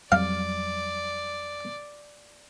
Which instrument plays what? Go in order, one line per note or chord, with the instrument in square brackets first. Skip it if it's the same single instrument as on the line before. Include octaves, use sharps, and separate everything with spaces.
[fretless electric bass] F2 F#3 G3 [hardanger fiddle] D5 [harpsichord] F5